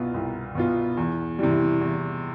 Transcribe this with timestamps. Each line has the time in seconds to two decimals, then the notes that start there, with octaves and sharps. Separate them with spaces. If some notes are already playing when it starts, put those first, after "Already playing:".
Already playing: C2 B2 B3 F4
0.14 C2
0.55 B2 B3 F4
0.97 E2
1.39 C3 E3 G3
1.81 E2